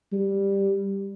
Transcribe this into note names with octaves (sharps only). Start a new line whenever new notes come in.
G3